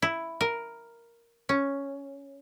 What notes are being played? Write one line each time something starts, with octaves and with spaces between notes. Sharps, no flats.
E4
A#4
C#4